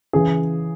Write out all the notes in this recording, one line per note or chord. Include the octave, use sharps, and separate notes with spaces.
C#3 E3 G#4